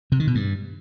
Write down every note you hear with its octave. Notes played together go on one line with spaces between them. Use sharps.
C3
D#3
B2
G2